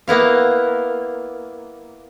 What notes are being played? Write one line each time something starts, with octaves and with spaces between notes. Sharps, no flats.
A#3 B3 E4 F5